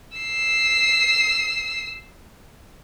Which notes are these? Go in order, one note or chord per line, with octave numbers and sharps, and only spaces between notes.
E6 C7